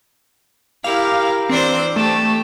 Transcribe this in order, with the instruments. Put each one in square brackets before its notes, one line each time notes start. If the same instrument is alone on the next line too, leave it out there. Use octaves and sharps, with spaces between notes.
[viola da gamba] E4 [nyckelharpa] G4 A#4 [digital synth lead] F5
[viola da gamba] E3 D4 C5 [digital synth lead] C4
[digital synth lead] A3 [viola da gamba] G4 [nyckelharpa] A5